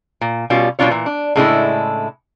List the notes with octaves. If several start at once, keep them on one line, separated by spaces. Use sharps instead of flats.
A#2
B2 G3 C#4 F4
B2 G3 A#3 D4 F4 C#5
A#2 E3
D4
A2 C#3 G#3 A3 D4 E4